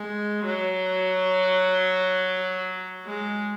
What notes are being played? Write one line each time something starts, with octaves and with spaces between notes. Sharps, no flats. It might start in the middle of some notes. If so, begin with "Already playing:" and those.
Already playing: G#3
F#3
G#3